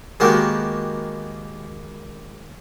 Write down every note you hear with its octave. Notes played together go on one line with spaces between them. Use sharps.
D#3 G#3 A#3 B3 F#4 G4